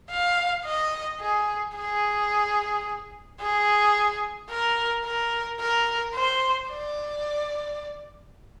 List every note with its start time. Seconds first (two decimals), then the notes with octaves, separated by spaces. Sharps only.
0.11 F5
0.65 D#5
1.20 G#4
1.76 G#4
3.40 G#4
4.50 A#4
5.05 A#4
5.60 A#4
6.14 C5
6.70 D5